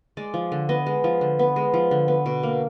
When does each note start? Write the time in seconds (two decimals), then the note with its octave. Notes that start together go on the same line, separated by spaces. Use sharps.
0.17 G#3 D5
0.34 F3
0.52 D3
0.69 B3 D#5
0.86 G#3
1.04 F3
1.21 D3
1.39 B3
1.56 G#3
1.74 F3
1.91 D3
2.08 B3
2.26 B2
2.43 A#3